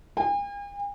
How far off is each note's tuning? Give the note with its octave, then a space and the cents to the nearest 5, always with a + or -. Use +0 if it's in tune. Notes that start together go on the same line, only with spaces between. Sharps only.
G#5 -45